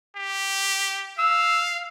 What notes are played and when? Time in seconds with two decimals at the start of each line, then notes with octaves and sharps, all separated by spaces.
0.17 G4
1.19 F5 E6